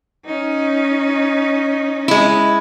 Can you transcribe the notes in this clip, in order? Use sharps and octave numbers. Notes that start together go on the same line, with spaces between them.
C#4 D#4
G#3 E4